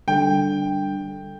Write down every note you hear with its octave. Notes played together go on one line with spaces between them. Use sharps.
D3 G3 D4 A4 G5